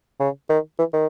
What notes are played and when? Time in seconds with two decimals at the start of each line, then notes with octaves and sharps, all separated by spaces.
0.20 C#3
0.49 D#3
0.79 E3
0.93 D#3